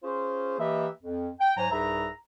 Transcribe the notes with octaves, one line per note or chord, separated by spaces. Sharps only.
C#4 F4 G#4 C5
E3 A#3 G4 B4 D#5 E5
F2
G5
G#2 F#3 C5 G#5 A#5
C2 G#2 G#4 B4 E5 A#5